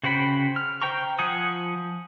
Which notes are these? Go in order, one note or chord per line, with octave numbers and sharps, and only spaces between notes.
C#3 F#4 C5 G5 B5
F6
C5 G5 A#5 C#6
F3 F#5 G#5 D#6